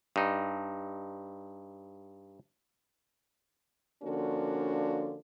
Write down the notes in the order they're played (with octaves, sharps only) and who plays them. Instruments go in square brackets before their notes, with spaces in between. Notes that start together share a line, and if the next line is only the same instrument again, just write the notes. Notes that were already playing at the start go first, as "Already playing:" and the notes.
[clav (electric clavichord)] G2 D#4
[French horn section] D3 F3 A#3 C#4 D4 F#4